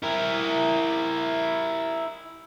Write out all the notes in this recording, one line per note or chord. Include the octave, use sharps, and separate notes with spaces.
E4 A#4